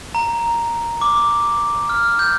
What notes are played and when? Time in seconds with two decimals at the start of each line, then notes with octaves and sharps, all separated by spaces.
0.15 A#5
1.01 D6
1.89 F6
2.19 G6